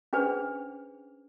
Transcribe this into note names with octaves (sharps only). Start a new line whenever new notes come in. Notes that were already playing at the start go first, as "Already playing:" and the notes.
C#4 D4 G#4 B4 C5